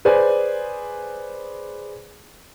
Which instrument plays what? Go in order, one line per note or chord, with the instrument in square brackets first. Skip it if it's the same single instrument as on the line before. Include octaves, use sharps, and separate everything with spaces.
[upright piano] G#4 B4 C5 D5 G#5